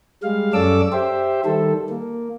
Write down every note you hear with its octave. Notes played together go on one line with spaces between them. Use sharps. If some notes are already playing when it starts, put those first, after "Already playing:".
G3 G#3 F5
F#2 C#4 A4 D5 D6 E6
G4 C5 E5
D#3 G3 A4
A#3